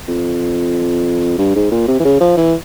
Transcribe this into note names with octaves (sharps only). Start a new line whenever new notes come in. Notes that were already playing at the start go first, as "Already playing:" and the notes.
F2
G2
G#2
A#2
C3
E3
C#3
F3
E3